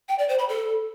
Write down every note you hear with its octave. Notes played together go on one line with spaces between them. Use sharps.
G5
D5
C5
B5
A4